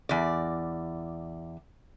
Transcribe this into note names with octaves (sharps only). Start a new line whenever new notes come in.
E2 D5